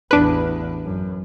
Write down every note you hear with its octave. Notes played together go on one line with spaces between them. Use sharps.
A1 E2 D4 B4
F#2